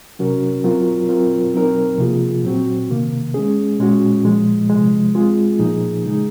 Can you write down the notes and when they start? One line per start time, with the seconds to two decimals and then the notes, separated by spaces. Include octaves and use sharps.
0.19 C3 F#3 C#4 F#4 A#4
0.64 F#3 C4 F4 A#4
1.09 F#3 C4 F4 A#4
1.54 F#3 C4 D#4 A#4
1.98 C3 F3 A#3 F4 G#4
2.43 A#2 F#3 C4 F#4
2.89 C3 D#3 A#3
3.34 G#3 C#4 G#4
3.80 A#2 G#3 C#4 F#4
4.24 A#2 F3 G#3
4.69 C3 F3 G#3
5.15 G#3 C4 F4 G#4
5.59 A#2 F3 A#3 D#4 G#4
6.05 C#3 G#3 D#4 G#4